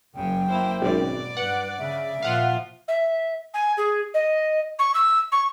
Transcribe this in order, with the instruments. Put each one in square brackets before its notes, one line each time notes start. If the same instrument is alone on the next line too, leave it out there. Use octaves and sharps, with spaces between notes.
[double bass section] F#1 F#2 [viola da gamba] C#3 [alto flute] G5
[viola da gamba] A#3 E4 C5
[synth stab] G#1 F#2 [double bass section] B2 [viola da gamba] D5
[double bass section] G2 [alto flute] B4 [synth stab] F#5
[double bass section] C#3 [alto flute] E5
[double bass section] A#2 [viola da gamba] F3 F4 [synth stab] F5 F#5
[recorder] E5
G#5
G#4
D#5
C#6
E6
C#6